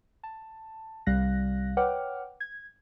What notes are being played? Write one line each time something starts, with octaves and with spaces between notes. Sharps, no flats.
A5
C2 G3 F5 F#6 A#6
B4 C#5 F#5 G5 D6 F6
G#6